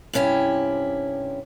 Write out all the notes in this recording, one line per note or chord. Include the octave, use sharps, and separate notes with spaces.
G2 C3 C#4 E4 G4